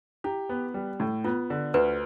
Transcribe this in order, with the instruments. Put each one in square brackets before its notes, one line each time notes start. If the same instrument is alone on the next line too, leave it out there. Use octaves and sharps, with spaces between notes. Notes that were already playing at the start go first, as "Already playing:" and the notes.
[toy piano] E4 [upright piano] G4
[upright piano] B3
G3
A2
[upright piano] B3 [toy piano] F4
[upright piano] D3
[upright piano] D2 [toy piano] B4